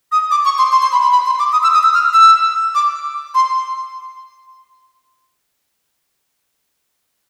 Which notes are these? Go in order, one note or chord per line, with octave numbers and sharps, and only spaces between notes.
D#6
D6
C#6
C6
C6
C6
B5
B5
B5
C6
D6
D#6
E6
D#6
E6
F6
E6
D6
C6